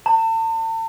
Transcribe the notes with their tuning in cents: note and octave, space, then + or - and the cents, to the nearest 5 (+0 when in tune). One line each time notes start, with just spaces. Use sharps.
A5 +40